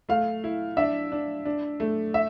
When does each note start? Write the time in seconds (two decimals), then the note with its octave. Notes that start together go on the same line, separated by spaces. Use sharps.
0.09 A3 F5
0.44 E4
0.77 D4 E5
1.12 D4
1.45 D4
1.80 A3
2.14 E5